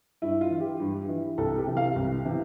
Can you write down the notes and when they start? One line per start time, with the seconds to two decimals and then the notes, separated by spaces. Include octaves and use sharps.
0.22 G2 E4
0.41 F4
0.51 E3
0.60 G4
0.80 G2
1.09 E3
1.38 C2 A4
1.58 G4
1.66 C3 E3
1.77 F5
1.96 C2
2.25 C3 E3